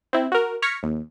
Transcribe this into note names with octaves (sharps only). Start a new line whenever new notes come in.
C4 E4
F#4 A#4
C#6 F6 G#6 A#6 B6 C#7
D#2